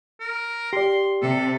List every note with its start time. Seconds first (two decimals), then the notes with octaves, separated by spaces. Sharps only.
0.20 A#4
0.73 G4 D5 C6
1.22 C3 A4